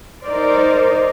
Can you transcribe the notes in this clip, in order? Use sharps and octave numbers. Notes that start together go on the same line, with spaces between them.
D#4 A#4 C5 D5